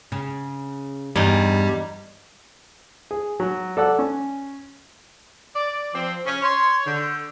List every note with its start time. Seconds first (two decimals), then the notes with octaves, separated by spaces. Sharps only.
0.12 C#3
1.16 E2 G2 G3 D#4
3.11 G#4
3.40 F#3
3.77 A4 D5 F#5 E6
3.99 C#4
5.56 D5
5.94 F3 C4
6.26 C#4
6.42 C#5 C6
6.86 D3 G6